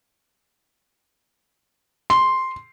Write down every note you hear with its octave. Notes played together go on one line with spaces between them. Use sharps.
C6